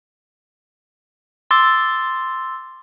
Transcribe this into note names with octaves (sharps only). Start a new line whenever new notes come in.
C6 D6 E6 A6